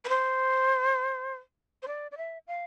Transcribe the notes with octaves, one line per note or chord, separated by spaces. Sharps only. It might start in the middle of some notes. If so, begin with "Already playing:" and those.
B4
C5
C5
D5
D5
E5
F5